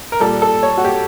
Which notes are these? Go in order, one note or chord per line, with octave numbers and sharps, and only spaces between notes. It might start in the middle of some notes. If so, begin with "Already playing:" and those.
A#4
A#2 G3 A4
A4
C#5
F#4
G4